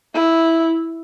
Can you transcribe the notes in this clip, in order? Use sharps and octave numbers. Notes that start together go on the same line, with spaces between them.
E4